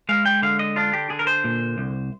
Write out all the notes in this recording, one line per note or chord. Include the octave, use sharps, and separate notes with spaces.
G#3 F5
G5
D3 F5
D#5
D4 F4
G4
D3 G#4
A#4
C5
A#2
C2